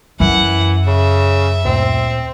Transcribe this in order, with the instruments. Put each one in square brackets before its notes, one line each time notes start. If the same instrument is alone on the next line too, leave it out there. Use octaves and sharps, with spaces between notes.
[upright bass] F#2 [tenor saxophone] E3 [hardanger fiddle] F#5
[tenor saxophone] C#3 [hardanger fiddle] E5
[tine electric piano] D2 A#2 [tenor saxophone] C4